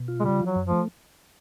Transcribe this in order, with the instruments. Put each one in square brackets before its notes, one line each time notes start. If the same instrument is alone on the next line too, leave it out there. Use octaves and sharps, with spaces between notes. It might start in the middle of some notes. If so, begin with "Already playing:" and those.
Already playing: [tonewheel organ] B2
F4
[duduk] G#3
[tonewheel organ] C#3 [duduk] G3
[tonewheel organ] F3
[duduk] F#3
[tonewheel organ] F#2
[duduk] F3 [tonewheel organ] A3